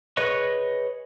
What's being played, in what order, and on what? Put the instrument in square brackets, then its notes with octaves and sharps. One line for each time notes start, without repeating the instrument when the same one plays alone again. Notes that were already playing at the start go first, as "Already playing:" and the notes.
[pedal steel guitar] G#4 B4 C#5 D#5 C#6